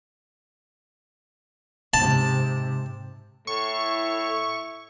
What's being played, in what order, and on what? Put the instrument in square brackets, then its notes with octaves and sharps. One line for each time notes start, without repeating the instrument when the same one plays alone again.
[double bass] G#2 C3 [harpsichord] A5
[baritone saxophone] A2 [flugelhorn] E4 [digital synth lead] C#6